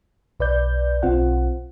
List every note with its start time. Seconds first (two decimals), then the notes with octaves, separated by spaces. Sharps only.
0.40 B1 B4 D5 G6
1.03 B1 C4 F4 F#5